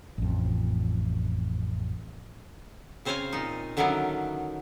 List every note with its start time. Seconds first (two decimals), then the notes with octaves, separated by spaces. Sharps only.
0.18 A1 F2
3.05 C#3 C4 C5 C#5 F5 G#5
3.33 A#2 D#4
3.77 D3 D#3 F#3 B3 C#4 E4